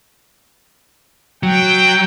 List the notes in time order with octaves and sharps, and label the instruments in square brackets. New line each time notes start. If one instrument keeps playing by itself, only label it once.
[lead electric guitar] F#3 [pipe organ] G5